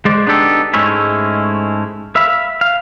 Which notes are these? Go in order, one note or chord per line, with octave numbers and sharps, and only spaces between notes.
G#3 C5 D5
B3 D4 D#4 G4 A4
G#2 G#3 A3 C#4 E4
E5 F5 B5
F5